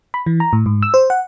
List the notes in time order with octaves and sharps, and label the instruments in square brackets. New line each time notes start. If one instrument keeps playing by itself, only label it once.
[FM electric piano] B5
E3
A#5
A2
G#2
E6
C5
F#5